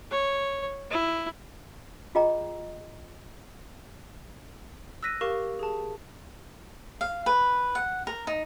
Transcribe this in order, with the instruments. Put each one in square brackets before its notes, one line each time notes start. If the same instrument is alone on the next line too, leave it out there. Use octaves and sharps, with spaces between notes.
[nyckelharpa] C#5
E4
[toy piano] F4 G#4 D#5 G5 A#5
[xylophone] E6 F#6 A#6 B6 D#7
G4 A#4 F5 C#6 E7
G#4 A5
[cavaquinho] F5
B4
F#5
A#4
D#4